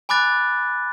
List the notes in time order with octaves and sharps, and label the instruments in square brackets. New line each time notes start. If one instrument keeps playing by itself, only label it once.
[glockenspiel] G#5 B5 D6 F#6 A6